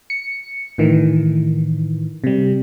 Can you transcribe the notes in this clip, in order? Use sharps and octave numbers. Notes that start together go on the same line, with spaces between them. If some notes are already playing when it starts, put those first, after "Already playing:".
C#7
A2 D#3 E3
C3 G3